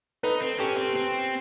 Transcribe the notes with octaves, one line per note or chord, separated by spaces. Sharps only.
D#4 A4 B4
C4
C#4 G4 A4
C4
C4